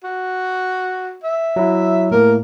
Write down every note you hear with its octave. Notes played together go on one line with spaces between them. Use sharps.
F#4
E5
F#3 E4
A2 A#3 A#4